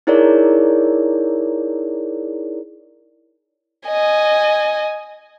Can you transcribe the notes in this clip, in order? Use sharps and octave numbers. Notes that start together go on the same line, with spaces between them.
D#4 E4 G#4 A#4 C#5 D5
D#5 G#5